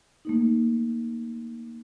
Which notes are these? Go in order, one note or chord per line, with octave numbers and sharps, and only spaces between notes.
A3 A#3 D#4